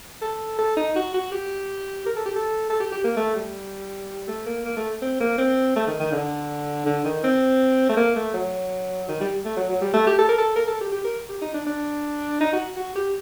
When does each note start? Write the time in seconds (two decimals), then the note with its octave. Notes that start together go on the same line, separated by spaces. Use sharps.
0.21 A4
0.58 A4
0.77 D#4
0.96 F#4
1.14 F#4
1.32 G4
2.06 A#4
2.16 A4
2.26 G4
2.36 A4
2.69 A4
2.80 G4
2.92 G4
3.04 A#3
3.17 A3
3.35 G3
4.28 A3
4.46 A#3
4.65 A#3
4.77 A3
5.02 C4
5.20 A#3
5.38 C4
5.76 A3
5.87 D#3
5.99 D#3
6.12 D3
6.86 D3
7.05 D#3
7.24 C4
7.89 A3
7.97 A#3
8.16 A3
8.34 F#3
9.08 D#3
9.20 G3
9.45 A3
9.56 F#3
9.70 F#3
9.81 G3
9.94 A3
10.07 G4
10.19 A4
10.29 A#4
10.38 A4
10.56 A#4
10.67 A4
10.81 G4
10.92 G4
11.04 A#4
11.29 G4
11.42 D#4
11.54 D4
11.67 D4
12.41 D#4
12.53 F#4
12.77 F#4
12.95 G4